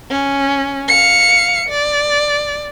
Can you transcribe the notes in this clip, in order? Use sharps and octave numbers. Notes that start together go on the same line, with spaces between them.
C#4
F5 C#7
D5